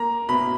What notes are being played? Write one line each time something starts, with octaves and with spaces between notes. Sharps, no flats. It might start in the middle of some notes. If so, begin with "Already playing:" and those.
Already playing: A#3 A#5
B2 B5